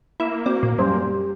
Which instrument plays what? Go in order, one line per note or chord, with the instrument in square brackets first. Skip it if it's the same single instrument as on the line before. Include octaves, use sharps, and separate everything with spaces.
[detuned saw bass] A#3 [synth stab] E4 E6
[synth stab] C4 D5 [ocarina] F#4
[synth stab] A#2
[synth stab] F#2 [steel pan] G3 C#4 C5 [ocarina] G4